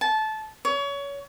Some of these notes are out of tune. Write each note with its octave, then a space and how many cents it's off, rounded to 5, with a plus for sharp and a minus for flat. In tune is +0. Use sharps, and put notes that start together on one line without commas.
A5 -20
C#5 +25